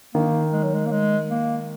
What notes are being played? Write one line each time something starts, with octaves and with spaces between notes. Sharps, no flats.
D#3 A#3
G#3
F#3
G#3
A#3
G#3
A#3